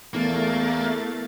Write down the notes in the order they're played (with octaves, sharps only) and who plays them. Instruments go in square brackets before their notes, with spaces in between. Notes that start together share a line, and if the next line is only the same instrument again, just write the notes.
[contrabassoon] E2 [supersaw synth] A3 A6 [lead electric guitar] A#3